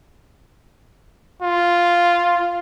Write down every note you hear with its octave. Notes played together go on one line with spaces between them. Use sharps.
F4